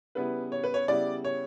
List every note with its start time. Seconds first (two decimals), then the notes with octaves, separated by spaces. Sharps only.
0.15 C#3 G3 B3 E4 B4
0.52 C#5
0.64 B4
0.74 C#5
0.88 C#3 G3 B3 E4 D5
1.24 C#5